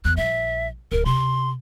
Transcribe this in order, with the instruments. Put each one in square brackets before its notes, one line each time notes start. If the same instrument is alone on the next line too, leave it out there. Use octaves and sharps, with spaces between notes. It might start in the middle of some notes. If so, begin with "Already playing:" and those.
[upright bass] E2 [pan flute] F#6
[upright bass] A#1 G3 [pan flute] E5
[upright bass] D1 A3 [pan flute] A#4
[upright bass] C3 [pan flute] C6